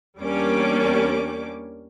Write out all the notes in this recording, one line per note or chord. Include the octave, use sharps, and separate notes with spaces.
E2 G3 A#3 C#4 D4 D6